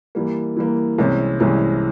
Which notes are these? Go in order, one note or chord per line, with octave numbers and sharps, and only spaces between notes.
E3 G3 A#3
E3 G3 A#3
C2 C3 E3 G#3 C#4
C2 C3 E3 G#3 C#4